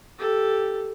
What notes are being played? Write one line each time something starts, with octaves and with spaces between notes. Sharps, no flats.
G4 A4